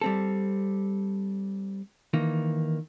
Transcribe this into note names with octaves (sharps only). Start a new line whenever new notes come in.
G3 C4 A4
D#3 E3 A#3